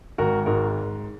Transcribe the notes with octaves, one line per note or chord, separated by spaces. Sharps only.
G#1 F#4 A#4
G#2 F#4 A#4